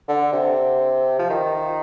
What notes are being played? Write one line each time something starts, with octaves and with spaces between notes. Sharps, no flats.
D3
C3
F3
D#3